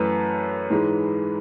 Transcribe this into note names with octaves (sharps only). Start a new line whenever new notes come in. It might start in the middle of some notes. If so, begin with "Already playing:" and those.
Already playing: F#2 E3 A3 B4
G#2 E3 G#3